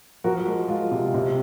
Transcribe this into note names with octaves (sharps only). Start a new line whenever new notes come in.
F3 F#4 A#4
G#3
G#3 F4
C3
C3